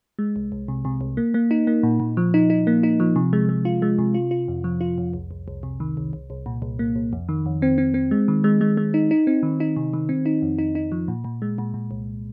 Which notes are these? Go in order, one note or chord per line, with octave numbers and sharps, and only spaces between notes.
G#3
C2
C2
C3
C3
C2
A#3
A#3
D#4
A#3
A#2
A#2
F3
D#4
D#4
A#3
D#4
F3
C3
G#3
G#3
F4
G#3
C3
F4
F4
F2
F3
F4
F2
C2
C2
C2
C3
D#3
C2
C2
C2
A#2
C2
A#3
C2
F2
D#3
F2
C4
C4
C4
G#3
D#3
G#3
G#3
G#3
D#4
D#4
C4
D#3
D#4
C3
D#3
C4
D#4
F2
D#4
D#4
F3
A#2
A#2
G#3
A#2
A#2
C2